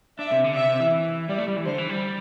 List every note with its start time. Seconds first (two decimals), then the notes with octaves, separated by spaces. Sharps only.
0.19 D4 E5
0.32 C3
0.44 D3
0.56 C3 E5
0.69 C3
0.80 E3
1.29 G3 D5
1.38 A3
1.48 G3
1.57 E3
1.66 D3 C5
1.78 E3
1.90 G3